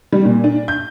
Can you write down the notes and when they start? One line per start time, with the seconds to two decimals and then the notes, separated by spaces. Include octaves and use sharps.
0.12 G3
0.25 A#2
0.44 D4
0.68 G6